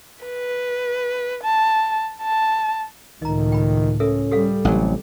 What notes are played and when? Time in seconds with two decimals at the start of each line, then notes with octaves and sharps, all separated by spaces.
0.25 B4
1.44 A5
2.22 A5
3.22 C#2 A2 D#3 D#5 A#5
3.52 G5 B5
4.00 C#4 A4 A#4 E5
4.31 G3 G4 A4 F5
4.65 A1 C3 F#3